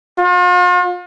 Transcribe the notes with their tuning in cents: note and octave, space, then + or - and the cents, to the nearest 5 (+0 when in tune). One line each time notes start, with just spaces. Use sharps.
F4 +40